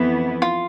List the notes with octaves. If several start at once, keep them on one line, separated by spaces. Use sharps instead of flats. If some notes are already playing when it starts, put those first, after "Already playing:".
Already playing: F2 E3 B3 E4
F4